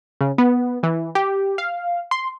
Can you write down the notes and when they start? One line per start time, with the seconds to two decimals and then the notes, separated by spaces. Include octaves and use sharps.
0.21 C#3
0.38 B3
0.83 E3
1.15 G4
1.58 F5
2.11 C6